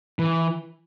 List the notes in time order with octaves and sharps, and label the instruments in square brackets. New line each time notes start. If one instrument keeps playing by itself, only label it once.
[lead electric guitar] E3